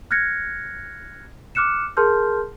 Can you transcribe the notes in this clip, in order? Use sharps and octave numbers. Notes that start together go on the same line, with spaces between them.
F6 F#6 G#6 A#6 C#7
D6 F6 F#6 C#7 E7
G#4 A#4 A5 C6 F6 G6